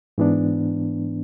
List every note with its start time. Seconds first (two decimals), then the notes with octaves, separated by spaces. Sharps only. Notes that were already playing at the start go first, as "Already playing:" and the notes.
0.18 G#2 E3 B3 D4